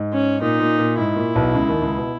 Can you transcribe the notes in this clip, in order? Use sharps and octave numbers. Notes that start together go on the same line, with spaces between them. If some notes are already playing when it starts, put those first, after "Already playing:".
Already playing: G#2
C#4
A#2 D#4
A#2
A#2
G#2 E4
A#2
B1 B2
C#2 C#3
D#2 D#3
C#2 C#3
B2